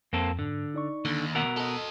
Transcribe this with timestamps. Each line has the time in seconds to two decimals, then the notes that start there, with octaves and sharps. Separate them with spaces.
0.13 F2 A#3 C4 A4
0.39 G#2 D3
0.75 D#4 D5 C#6
1.05 D#2 D3
1.35 B2 A#4 F#5 E6 B6
1.57 A4 D#5